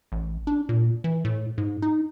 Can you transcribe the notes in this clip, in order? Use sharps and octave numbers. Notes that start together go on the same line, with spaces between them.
A1
D4
A#2
E3
A2
G#2
D#4